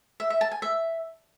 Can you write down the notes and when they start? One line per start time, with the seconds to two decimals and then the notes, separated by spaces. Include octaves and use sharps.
0.20 E5
0.30 E5
0.41 A5
0.52 G#5
0.62 E5